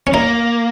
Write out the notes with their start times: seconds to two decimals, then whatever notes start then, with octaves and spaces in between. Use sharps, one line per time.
0.07 C#4
0.13 A#3 D#4